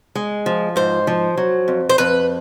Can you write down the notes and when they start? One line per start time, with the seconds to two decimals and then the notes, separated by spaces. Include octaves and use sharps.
0.15 G#3
0.46 F3
0.76 G#2 C5
1.07 F3
1.37 F#3
1.68 F2
1.90 C5
1.98 F2 B4